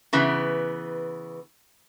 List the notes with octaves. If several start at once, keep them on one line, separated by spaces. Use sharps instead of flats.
C#3 E3 B3